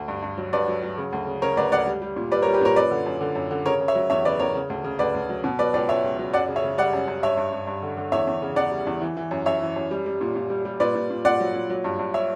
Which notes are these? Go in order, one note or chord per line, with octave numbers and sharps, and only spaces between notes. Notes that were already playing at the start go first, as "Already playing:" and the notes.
Already playing: D2
G2
G2
F#3
G2 B4 D5
F#3
F#3
C#3
D2
C#3
C#3 A#4 C#5
D2 B4 D5
D2 D5 F#5
G3
G3
A#2
G3 B4 D5
A#4 C#5
G3
G4 B4
A#2 A#4 C#5
F#2 B4 D5
D3
F#2
D3
F#2
D3
C#3 A#4 C#5
C#3
C#5 E5
F#3
E2 C#5 E5
C#3 B4 D5
E2 A#4 C#5
C#3
D2
C#3
D2 B4 D5
D2
F#3
B2
F#3 B4 D5
C#2 B4 D5
C#2 C#5 E5
C#2
F#3
F#2 D5 F#5
C#3
C#5 E5
C#3
G3 D5 F#5
F#2
F#2
G2 C#5 E5
G2
G2
G2
D3
D3
E2 C#5 E5
E2
C#3
E2 D5 F#5
G3
E2
E3
E3
F#2
F#2 C#5 E5
E3
F#2
G3
G3
A#2
A#2
G3
G3
A#2 B4 D5
A#2
A#2
A#2 D5 F#5
F#3
A#2
F#3
G2
G2
C#5 E5